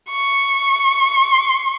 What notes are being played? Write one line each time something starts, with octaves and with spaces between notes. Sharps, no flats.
C#6